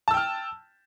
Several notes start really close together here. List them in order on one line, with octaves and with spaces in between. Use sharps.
A5 E6 G5 F6